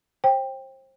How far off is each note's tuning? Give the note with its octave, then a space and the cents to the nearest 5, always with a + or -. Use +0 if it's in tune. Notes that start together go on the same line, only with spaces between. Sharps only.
C5 +30 G5 +10